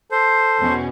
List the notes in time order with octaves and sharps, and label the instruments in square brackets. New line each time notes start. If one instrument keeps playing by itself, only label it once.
[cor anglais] A4 [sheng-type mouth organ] C5
[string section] E2 B2 C#4